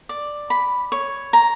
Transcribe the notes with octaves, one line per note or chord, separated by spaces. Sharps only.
D5
B5
C#5
A#5